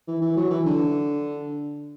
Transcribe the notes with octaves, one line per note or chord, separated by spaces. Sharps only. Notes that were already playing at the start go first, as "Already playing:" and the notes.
E3
E3
F#3
E3
D3